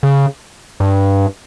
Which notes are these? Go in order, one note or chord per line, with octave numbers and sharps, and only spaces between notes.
C#3
G2